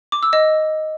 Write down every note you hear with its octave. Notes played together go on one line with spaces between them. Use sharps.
D6
E6
D#5